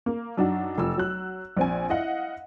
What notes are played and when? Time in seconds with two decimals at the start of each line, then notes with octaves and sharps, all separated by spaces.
0.06 A#3
0.37 F#2 D4 D#4 F#4
0.77 F1 F3 E6
0.97 F#3 F#6
1.57 A#1 C4 G#5
1.90 E4 D#5 F5 F#5